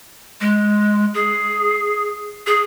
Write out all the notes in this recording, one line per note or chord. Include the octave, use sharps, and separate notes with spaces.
G#3
G#4
G#4